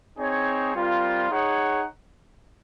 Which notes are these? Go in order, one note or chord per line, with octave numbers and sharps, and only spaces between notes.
C4 D#4 G#4 C#5
G3 C4 F4 A#4
D#4 G#4 C#5 F#5